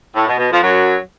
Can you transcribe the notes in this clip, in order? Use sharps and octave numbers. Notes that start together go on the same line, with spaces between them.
A2
B2
B2
F2 F3
F#2 F#3